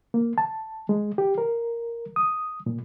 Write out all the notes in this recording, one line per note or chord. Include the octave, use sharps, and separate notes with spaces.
A#3
A5
G#3
G4
A#4
D#6
A#2